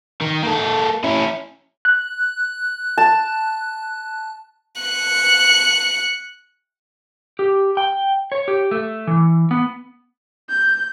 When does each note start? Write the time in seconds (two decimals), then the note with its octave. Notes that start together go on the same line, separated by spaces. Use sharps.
0.21 D#3
0.43 A#3 A4
1.04 C#4 E4
1.85 F#6
2.98 A5
4.82 F#6 C#7
7.39 G4
7.77 G5
8.32 C#5
8.48 G4
8.71 A3
9.07 E3
9.51 B3
10.49 G6